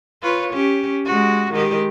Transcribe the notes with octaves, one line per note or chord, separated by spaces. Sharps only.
F4 B4 C#5
C#4 G4
G#3 F#4
D#3 G#3 G4